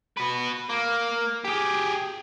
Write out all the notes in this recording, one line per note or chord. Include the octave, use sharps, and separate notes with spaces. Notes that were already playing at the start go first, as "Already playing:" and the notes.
F#4 B4
A#3
G4 G#4